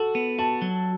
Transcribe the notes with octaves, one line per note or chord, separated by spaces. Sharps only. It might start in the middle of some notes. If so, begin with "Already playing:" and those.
Already playing: F#4 A4
B3
F#4 A5
F#3